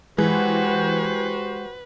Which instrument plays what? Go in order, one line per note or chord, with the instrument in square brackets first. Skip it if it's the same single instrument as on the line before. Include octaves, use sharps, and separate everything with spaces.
[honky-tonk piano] E3 [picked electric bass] G#3 [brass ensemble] F#4 G4 C5 [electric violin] B4